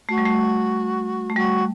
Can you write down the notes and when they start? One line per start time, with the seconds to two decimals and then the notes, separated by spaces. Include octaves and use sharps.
0.09 A3 F#4
0.18 G3
0.25 A3
1.30 A3
1.36 G3 F#4